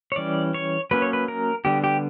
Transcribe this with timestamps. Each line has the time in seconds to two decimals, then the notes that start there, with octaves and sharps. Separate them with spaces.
0.12 C#5
0.16 E3 G3 C#4 D5
0.54 C#5
0.91 F#3 A#3 C#4 B4
1.02 C#5
1.13 B4
1.28 A#4
1.65 D3 G3 B3 G4
1.84 G4